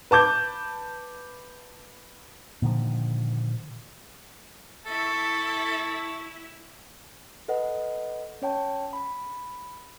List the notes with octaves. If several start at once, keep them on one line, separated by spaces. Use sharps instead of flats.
B4 A5 D6 G6
A#2 D3 D#3 F3
E4 A4 E5 A5 C#6
A4 B4 D#5 F#5
C#4 C#5 G5 A5
B5